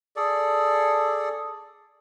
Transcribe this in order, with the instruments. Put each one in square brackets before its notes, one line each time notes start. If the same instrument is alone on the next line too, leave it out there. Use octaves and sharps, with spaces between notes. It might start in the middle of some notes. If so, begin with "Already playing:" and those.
[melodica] G#4 A4 D5